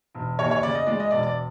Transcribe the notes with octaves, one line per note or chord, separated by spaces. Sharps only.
E1
D#2 C#5
C#5
C#3 D5
D#5
G#3 D5
D#5
E1 D5
D5